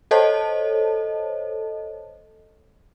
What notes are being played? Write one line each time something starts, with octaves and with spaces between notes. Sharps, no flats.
A4 C5 C#5 D#5 A5